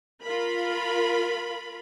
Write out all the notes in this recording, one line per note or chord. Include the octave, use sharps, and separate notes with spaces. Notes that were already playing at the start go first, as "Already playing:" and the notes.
F4 A#4 B5